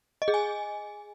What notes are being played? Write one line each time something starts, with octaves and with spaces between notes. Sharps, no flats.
D#5
G#4
G#5